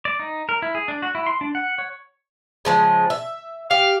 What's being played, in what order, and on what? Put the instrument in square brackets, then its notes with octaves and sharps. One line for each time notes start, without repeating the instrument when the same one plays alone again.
[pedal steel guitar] D5
D#4
A#4
E4
G#4
D4
F#4
E4
C6
D4
F#5
C#5
[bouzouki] C#3 F3 G#3
E5
[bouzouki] G4 [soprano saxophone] F5